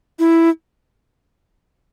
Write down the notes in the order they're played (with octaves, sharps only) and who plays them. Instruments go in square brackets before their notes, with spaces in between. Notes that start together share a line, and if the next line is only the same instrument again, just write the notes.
[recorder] E4